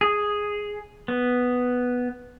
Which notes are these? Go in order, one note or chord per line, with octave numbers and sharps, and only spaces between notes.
G#4
B3